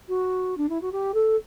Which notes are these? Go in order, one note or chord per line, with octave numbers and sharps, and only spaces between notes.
F#4
D4
E4
F#4
G4
A4